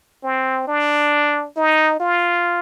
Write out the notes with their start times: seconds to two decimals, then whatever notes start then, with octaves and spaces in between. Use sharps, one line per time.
0.24 C4
0.67 D4
1.56 D#4
2.00 F4